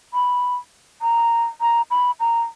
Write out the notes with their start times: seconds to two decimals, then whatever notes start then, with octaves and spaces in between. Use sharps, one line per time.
0.14 B5
1.02 A#5
1.61 A#5
1.91 B5
2.20 A#5